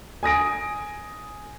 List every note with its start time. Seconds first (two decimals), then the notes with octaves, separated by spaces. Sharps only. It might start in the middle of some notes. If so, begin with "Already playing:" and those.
0.23 G#5 D#6 A#6 D7